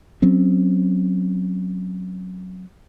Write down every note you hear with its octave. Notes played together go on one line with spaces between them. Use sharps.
F#3 C4 C#4